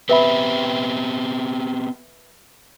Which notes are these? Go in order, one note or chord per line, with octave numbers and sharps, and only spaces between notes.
B3 C4 G4 B4 E5 B5